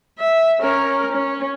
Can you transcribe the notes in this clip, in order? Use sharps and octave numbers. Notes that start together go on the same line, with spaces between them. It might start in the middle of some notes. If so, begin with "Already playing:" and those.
E5
C#4 A#4
C#4